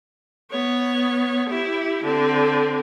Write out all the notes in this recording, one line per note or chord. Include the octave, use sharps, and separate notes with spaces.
B3 C#5
E4 G4
D3 C4